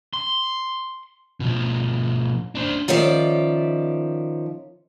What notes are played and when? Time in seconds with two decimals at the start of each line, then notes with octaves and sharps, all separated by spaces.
0.13 C6
1.40 B2 F3
2.55 D4 C5
2.88 D#3 F3 C#4 D5 E5